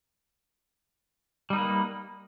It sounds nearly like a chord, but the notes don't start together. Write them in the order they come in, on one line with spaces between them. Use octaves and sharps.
G3 D#4 B4 A#3